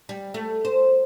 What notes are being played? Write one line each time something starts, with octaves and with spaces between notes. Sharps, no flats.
G3
A3
C5